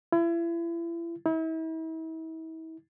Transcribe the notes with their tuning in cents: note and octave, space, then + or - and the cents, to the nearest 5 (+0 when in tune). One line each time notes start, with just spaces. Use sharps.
E4 +35
E4 -40